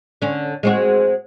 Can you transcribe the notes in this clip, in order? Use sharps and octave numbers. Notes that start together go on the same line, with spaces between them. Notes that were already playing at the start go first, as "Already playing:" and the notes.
D3 C#4
G#3 C4 F#4